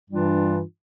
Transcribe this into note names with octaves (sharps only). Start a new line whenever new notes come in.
G2 E3 G3 D4 F4